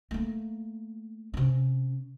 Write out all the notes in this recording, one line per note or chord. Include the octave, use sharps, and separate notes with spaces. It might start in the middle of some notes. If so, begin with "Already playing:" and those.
A3 A#3
C3 C#4